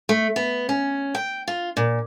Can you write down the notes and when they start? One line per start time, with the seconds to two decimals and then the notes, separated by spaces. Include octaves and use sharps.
0.09 A3
0.36 B3
0.69 C#4
1.15 G5
1.48 F4
1.77 A#2